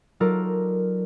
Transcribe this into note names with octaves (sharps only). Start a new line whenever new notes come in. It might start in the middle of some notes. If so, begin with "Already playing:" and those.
F#3 D#4 F4 A4 A#4 D5